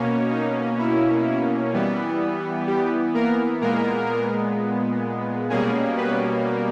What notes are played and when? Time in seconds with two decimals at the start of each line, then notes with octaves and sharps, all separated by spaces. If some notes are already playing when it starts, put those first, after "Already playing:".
Already playing: B2 A#3 C#4
0.31 D#4
0.79 E4
1.73 E3 G3 B3
2.67 G3 G4
3.14 A#3 A#4
3.61 A#2 G#3 A#3 B3 A#4
5.50 B2 G3 G#3 A#3 C#4 G#4
5.98 B3 B4